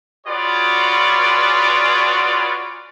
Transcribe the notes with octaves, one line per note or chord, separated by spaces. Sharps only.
F4 F#4 G#4 B4 C#5 D5